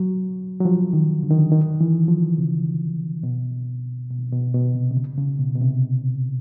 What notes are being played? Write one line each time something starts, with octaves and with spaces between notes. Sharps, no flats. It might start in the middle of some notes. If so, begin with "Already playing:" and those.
Already playing: F#3
F#3
F3
D#3
D3
D#3
D3
D#3
E3
F3
C#3
B2
B2
B2
B2
C3
C3
C#3
C#3
B2
B2
C3